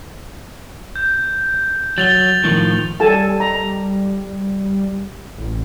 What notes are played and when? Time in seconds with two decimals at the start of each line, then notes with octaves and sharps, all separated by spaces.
0.96 G6
1.98 F#3 A6 F7 G7
2.44 A2 D#3 F3
3.00 G3 A4 G#5 A5
3.40 A#5
5.38 A1